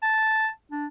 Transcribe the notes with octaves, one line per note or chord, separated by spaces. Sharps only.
A5
D4